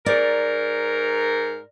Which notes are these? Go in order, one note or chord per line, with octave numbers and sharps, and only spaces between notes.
G#2 A#4 D5